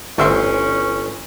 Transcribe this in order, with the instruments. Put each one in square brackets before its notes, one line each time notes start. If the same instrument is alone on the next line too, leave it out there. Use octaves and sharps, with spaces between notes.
[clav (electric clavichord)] G1 [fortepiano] D2 E5 C6 [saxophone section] E3 C#4